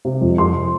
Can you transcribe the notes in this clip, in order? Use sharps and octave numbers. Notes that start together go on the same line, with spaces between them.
C3
F2
F2 C6